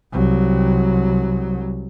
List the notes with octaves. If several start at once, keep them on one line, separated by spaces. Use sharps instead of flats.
C2 F#3